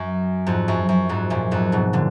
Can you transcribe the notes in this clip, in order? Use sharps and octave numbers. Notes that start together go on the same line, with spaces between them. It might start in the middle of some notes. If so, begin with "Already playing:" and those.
Already playing: F#2
F2 G#2
F#2
F#2
F2 G#2
F#2 A#2
F2 G#2
G#2 B2
A#2 D3